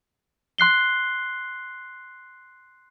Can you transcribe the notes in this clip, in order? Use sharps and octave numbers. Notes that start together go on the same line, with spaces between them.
C6 F#6 C7 G7